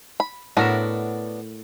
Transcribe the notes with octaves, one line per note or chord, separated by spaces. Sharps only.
B5
A2 B3 D4 F#4 A#4 E5